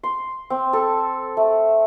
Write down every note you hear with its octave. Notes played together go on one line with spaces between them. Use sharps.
C6
C4
A4
A3